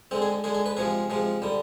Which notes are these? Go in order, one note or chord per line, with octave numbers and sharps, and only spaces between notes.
D3 G#3 C4
G#4
D3 G#3 G#4
G#4
B4
C3 F3 G#3 G#4
C3 F3 G#3
D3 G3